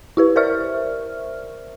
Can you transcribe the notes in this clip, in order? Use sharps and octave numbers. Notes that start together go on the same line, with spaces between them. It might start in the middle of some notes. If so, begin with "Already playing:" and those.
E4 G4 B4
A#4 C5 D5 E5 C#6 F6